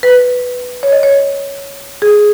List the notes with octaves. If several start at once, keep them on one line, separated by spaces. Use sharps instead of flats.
B4
C#5
D#5
C#5
G#4